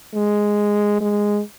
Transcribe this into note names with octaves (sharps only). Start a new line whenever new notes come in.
G#3
G#3